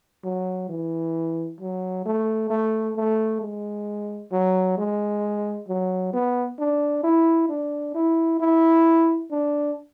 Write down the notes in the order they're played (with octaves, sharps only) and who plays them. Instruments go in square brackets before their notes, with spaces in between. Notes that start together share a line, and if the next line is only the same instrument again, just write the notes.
[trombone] F#3
E3
F#3
A3
A3
A3
G#3
F#3
G#3
F#3
B3
D4
E4
D4
E4
E4
D4